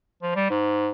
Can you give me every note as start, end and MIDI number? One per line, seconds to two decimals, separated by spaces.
0.22 0.32 53
0.35 0.48 55
0.50 0.91 44